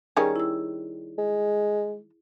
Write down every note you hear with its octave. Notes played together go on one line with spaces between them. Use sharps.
D#3 G3 C#4 G#4
E4 E6
G#3